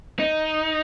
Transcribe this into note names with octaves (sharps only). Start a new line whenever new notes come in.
D#4